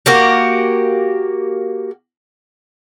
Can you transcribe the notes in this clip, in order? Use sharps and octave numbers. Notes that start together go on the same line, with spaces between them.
A#3 F#4 G4